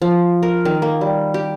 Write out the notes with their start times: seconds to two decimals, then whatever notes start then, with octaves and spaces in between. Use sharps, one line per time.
0.02 F3
0.43 A#4
0.65 D#3
0.82 A#3
1.01 G3
1.34 G4